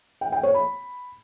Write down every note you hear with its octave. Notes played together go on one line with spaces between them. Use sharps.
G5
G5
C#5
B5